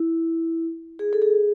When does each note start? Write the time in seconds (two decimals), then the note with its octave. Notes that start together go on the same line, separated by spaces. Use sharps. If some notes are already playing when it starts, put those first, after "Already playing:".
Already playing: E4
0.99 G#4
1.13 A4
1.22 G#4